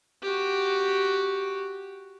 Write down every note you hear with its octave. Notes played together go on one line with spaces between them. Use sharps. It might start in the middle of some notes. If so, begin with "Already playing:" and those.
F#4 G4